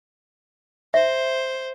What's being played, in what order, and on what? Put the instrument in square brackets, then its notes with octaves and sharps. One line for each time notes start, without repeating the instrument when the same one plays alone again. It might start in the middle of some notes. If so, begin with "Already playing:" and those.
[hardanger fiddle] C5 [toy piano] E5